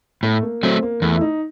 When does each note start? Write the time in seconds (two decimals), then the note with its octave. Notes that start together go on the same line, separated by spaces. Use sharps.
0.23 A2 A3
0.43 A#3
0.63 F#3 A3 C4
0.83 A#3
1.02 E2 A3
1.17 E4
1.21 D#4